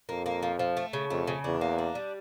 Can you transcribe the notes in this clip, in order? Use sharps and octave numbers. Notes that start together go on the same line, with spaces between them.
F2 A#3
A#3
F3
F3
A3
C#3
F2 A3
C#3
E2 D4
A#3
D4
G3